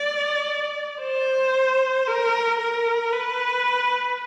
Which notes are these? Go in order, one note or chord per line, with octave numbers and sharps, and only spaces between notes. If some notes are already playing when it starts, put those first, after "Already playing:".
Already playing: D5
C5
A#4
A#4
B4